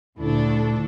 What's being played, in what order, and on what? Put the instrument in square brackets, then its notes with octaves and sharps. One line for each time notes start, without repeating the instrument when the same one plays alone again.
[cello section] D2 D4 A4 [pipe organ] A#2 D3 E4